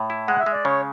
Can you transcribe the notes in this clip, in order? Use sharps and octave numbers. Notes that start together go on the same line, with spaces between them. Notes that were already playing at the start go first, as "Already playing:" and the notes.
Already playing: A2
E4
G#3 F#5
E5
G#3
D5
C#3 C#5